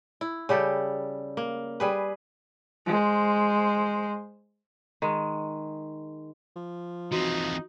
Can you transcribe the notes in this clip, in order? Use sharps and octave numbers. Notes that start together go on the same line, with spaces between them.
E4
C#3 G3 G4 A4
A#3
G3 G#4 B4
G#3 C5
D#3 G#3
F3
E3 C4 D#4 F#4